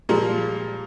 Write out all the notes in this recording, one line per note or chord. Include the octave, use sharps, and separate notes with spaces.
A#2 F3 G3 G#3 A#3